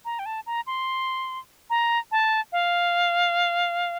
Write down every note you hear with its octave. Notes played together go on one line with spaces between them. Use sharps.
A#5
G5
A5
A#5
C6
A#5
A5
F5